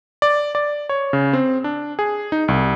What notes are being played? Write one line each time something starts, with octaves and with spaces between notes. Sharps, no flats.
D5
D5
C#5
C#3
C4
D4
G#4
D#4
C2